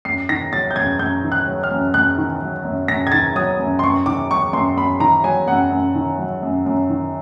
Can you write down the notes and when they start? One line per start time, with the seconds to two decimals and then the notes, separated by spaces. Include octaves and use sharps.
0.05 F#2 C7
0.29 D#3 A#6
0.53 F#3 A6
0.71 G6
0.76 F#2 G#6
0.99 F#2 G6
1.24 D#3
1.32 F#6
1.47 F#3
1.63 F6
1.71 F#2
1.94 F#2 F#6
2.18 D#3
2.42 F#3
2.65 F#2
2.88 F#2 A#6
3.07 G#6
3.12 D#3 A6
3.36 F#3 D#6
3.59 F#2
3.79 C6
3.83 F#2 C#6
4.06 D#3 D6
4.30 F#3 C#6
4.53 F#2 C6
4.77 F#2 B5
5.00 D#3 A#5
5.24 F#3 G#5
5.48 F#2 F#5
5.72 F#2
5.95 D#3
6.19 F#3
6.43 F#2
6.66 F#2
6.90 D#3